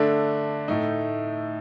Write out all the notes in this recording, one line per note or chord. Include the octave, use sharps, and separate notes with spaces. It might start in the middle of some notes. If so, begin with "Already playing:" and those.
Already playing: D3 A3 D4 A4
A2 A3 D#4